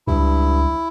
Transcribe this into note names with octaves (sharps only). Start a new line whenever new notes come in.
C#2 G2 E4